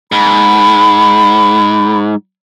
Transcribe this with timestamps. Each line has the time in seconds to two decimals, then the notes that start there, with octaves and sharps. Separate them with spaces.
0.12 G#2 B5